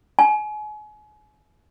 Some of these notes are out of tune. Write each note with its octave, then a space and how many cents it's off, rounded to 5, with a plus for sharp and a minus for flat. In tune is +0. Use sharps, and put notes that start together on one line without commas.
G#5 +35